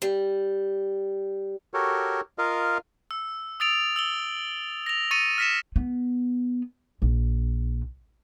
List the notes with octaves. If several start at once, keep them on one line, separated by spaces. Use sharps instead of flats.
G3
F#4 G4 A4 A#4 C#5
F4 A#4 D#5 F5
E6
D#6 E6 A6 D7 F7
E6 F#7 G7
A#6 F7
C#6 A6 C#7 D#7
F6 A#6 B6 C#7 E7
B3
A#1